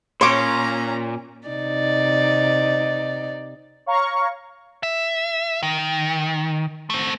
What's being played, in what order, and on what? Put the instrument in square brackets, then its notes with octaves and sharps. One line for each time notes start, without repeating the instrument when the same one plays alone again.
[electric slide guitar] A#2 [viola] C#4 A#5 [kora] C#5 [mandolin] C6 D6
[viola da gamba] C3 D#4 D5
[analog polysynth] C#5 F5 A#5 C#6
[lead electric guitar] E5
D#3
A3 C4